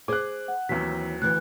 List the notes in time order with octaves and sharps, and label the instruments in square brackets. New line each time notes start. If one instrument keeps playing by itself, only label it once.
[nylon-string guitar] G#4 C5 [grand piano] D6 F#6
[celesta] F#5
[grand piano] D#2 F#3 [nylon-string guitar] E3 C4 [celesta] B6
[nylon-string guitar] D2 E3 [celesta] F#6